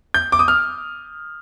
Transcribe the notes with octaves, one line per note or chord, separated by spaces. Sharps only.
G6
D6
D#6
F6